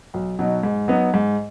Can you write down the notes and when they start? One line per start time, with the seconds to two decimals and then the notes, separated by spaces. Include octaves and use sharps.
0.14 B1
0.39 B2 F#3 D#4
0.63 G#2
0.88 F#3 B3 D#4
1.14 G#2